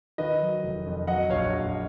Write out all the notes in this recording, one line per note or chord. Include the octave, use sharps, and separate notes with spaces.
D#3 B4 D#5
F#3
F1
F2
F#3 D#5 F#5
A#1 C#5 F5
A#1